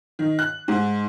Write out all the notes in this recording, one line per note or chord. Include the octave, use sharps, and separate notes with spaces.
D#3
F#6
G#2